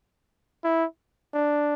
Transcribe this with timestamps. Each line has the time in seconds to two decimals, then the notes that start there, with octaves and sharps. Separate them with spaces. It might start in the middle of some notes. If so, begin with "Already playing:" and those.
0.64 E4
1.34 D4